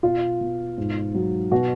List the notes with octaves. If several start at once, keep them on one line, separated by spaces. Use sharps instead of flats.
B2 F4
B2
G#2
F#3
B2 F#4